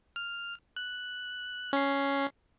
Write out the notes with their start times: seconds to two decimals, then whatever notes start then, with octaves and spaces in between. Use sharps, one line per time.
0.16 F6
0.76 F#6
1.73 C#4 C7